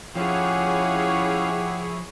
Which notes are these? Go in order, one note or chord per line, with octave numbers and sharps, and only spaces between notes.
F3 C#4 E4 G4 G#4 C#5 F5 F#5